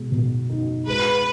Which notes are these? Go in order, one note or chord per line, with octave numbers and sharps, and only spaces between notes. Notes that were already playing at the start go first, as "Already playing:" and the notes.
Already playing: B2 G#3
B2
D#4
G#3 B4